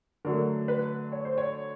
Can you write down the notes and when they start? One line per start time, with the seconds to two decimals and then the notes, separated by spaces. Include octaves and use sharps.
0.25 D3 F#3 A3 A#4
0.68 B4
1.12 C#5
1.25 C5
1.38 C#5